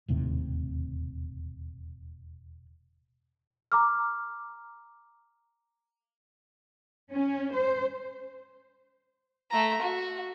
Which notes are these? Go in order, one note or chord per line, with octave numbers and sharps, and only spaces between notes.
E1 D#2 A2 C3
A#5 D6 F6
C#4
C5
A3 A#5
F#4